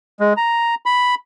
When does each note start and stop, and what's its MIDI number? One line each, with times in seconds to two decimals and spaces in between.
0.20 0.33 56
0.37 0.75 82
0.86 1.15 83